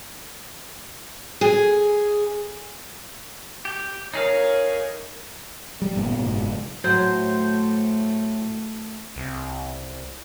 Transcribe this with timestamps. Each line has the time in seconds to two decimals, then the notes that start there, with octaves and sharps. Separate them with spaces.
1.41 G#4
3.65 G4
4.14 D#4 G#4 A#4 C#5 F5
5.82 G3
5.95 G1 A#2 G3 B3
6.19 F#1 G#2 B2
6.84 A2 F#3 A3 C5
9.16 C2